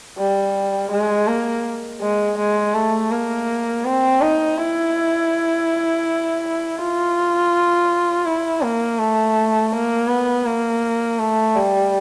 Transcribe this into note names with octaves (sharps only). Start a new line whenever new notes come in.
G3
G#3
A#3
G#3
G#3
A3
A#3
C4
D#4
E4
F4
E4
A#3
A3
A#3
B3
A#3
A3
G3